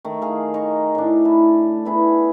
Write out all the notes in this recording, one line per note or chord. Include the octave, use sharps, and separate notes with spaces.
D#3 A3
G#4 F5
D#4 A#4 D#5 C#6
A2 D4
E4 A4
B3 E4 G#4